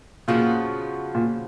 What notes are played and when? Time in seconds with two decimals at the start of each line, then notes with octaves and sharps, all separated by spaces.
0.28 A#2 C#3 F3 B3 F#4
1.15 A#2